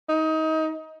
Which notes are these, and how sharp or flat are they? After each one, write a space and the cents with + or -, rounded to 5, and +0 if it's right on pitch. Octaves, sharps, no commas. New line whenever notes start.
D#4 +25